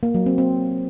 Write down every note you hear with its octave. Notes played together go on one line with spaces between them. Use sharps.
A#3
F#3
C4
C4